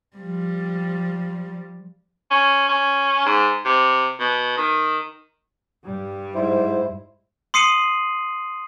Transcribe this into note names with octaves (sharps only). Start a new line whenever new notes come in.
F3 G3
C#4
C#4
G#2
C3
B2
D#3
G2 G3
G#2 E4 C5
C6 D#6 C7 C#7 D#7 F#7